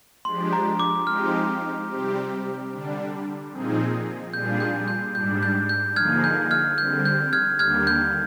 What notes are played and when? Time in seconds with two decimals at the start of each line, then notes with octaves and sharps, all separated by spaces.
0.25 F3 G#3 D4 G4 C6
0.53 A#5
0.80 D6
1.06 F3 G#3 C4 D#4 G4 F6
1.89 C3 G3 C4 G4
2.70 D3 G3 D4
3.52 A#2 F3 C4 D#4 G#4
4.33 A#2 G3 D4 F4 G#4 G6
4.60 G6
4.88 G6
5.15 G#2 G3 D4 G6
5.43 G6
5.69 G6
5.96 D3 F3 A#3 D#4 G#4 F6 G#6
6.24 G6
6.51 F6 G#6
6.78 D3 G3 C4 G6
7.05 G6
7.33 F6 G#6
7.59 D#2 D3 G3 A#3 F6 G#6
7.87 G6